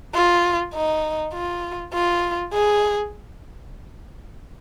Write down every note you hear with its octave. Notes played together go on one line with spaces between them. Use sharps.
F4
D#4
F4
F4
G#4